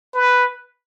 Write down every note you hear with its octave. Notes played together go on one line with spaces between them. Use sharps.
B4